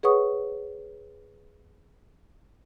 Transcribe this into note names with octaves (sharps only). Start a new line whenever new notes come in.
G#4 B4 C#5 F#5 C#6 D#6